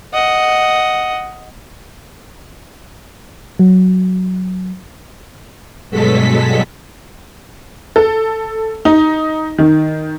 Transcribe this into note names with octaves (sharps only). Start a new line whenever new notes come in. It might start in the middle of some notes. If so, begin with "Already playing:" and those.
D#5 F#5
F#3
G2 B2 F#3 G#3 A4 B6
A4
D#4
D#3